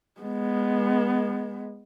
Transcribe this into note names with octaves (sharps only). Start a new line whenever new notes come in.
G#3 B3